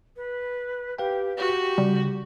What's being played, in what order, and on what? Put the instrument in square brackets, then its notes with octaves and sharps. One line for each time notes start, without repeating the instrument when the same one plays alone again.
[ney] B4
[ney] G4 [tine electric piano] B4 F5 G5
[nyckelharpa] F#4 [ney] G4
[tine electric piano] C#3 [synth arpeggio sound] G3